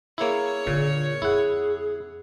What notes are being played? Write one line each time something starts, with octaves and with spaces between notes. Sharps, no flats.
A#3 E4 G#4 C#5
A#2 D3
F2 E4 G#4 F#5